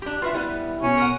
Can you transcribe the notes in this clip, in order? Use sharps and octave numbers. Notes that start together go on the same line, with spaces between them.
D4 G4
F4 F#4 B4 E5
G3 B3 E4 B4
B2 C#4
A#4 F#5